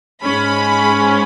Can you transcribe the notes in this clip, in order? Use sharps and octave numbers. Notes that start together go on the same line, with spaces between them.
G#2 G#3 C#4 B5